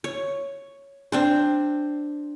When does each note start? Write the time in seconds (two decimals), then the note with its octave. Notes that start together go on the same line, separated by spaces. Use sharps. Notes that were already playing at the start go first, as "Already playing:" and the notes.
0.04 C#5
1.12 C4 D4 C5